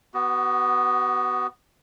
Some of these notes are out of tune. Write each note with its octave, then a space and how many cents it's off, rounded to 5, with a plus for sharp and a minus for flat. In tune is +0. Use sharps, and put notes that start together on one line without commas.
B3 +0 F#4 +30